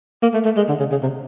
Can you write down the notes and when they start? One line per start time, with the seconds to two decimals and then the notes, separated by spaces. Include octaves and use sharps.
0.23 A#3
0.34 A3
0.45 A3
0.57 G#3
0.69 D3
0.79 C#3
0.91 C#3
1.03 C3